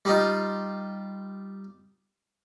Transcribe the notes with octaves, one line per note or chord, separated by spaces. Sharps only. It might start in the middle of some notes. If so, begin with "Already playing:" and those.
G3 D#4 F4